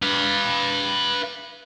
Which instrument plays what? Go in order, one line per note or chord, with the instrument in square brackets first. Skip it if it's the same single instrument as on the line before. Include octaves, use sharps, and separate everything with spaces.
[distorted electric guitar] B4 F5